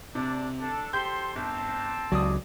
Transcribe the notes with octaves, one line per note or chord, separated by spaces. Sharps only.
C3 D4 D5
D4 A4
G4 A4 C5 C6 G6
G1 C4 A5
C#2 F#3 D5 D6 D#6